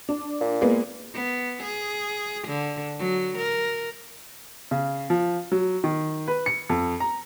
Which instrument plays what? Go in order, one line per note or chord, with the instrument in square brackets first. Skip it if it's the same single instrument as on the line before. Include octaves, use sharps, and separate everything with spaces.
[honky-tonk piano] D4
[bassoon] A#2
[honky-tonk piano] G#3 A#3 B3
[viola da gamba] B3
G#4
D3
F#3
A#4
[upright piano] C#3
F3
F#3
D#3
B4
C#7
F2
A#5